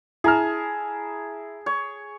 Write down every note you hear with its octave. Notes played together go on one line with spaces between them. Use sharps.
E4 G#4 A5 A#5 F6
C#5